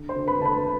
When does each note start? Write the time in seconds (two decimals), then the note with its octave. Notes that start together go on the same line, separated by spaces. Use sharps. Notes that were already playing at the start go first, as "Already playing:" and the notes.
Already playing: D3
0.09 C5 C6
0.16 D3
0.28 B4 B5
0.40 D3 A5
0.45 B4 B5